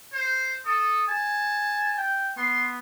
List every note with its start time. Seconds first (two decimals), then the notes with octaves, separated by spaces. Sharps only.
0.13 C5
0.66 A4 D#6
1.08 G#5 A5
1.98 G5
2.37 B3 C6